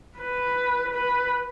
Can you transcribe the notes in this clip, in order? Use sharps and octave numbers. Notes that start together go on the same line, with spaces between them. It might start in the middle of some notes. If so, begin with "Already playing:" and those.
B4
B4